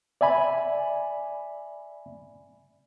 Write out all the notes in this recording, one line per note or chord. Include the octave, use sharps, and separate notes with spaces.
D5 E5 G#5 B5